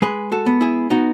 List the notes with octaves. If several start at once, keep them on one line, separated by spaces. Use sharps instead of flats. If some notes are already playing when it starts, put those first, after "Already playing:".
G#3 G#4 B4
F#4 A4
B3
E4 G#4
B3 D#4 F#4